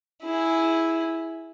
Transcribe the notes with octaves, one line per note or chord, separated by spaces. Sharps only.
E4 G#4